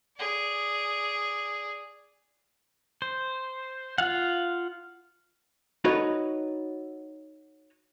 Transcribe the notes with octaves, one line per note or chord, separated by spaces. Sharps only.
G#4 D5
C5
F4 F5 F#5
D#4 F#4 A4 B4 C#5 D#5